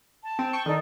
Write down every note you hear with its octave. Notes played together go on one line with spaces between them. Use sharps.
A5
C4
G5 C#6
D#3 D#4 A4 D5